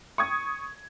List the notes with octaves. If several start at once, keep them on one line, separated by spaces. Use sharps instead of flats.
C#6 D#6 G#6